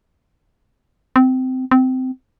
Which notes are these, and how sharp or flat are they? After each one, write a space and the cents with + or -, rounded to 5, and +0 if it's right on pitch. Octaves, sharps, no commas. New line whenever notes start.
C4 -20
C4 -20